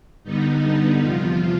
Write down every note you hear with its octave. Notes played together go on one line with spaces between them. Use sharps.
G2 D3 G3 B3 D#4
E2 C3 F3 F4